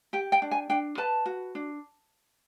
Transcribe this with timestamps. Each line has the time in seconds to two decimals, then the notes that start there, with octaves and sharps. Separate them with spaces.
0.13 G4 G5
0.32 G5
0.42 D4
0.51 G#5
0.70 D4 G5
0.98 B4 A5
1.26 F#4
1.55 D4